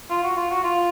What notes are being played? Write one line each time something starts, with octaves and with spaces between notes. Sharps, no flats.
F4
F#4
F4
F#4
F4